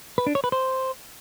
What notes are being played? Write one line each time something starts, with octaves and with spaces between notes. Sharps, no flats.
B4
D4
C#5
B4
C5